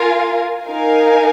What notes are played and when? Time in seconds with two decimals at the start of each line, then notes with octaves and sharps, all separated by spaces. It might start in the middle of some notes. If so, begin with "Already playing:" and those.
Already playing: F4 A#4 F5 G#5
0.66 D#4 A#4 F5 G#5